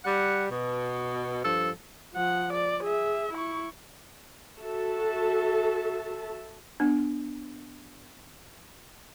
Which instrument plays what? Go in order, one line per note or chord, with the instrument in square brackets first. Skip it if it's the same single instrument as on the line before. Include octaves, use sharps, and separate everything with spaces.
[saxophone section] G3 F#5
B2
G2 F3 A4
[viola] F3 F#5
D5
G#4 E5
E4 C#6
[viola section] F#4 A4 E5 A5
[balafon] B3 D4